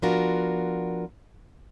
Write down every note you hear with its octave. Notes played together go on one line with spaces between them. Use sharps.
F3 B3 D4 F4 F#4 A#4